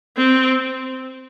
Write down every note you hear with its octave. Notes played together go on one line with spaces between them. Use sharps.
C4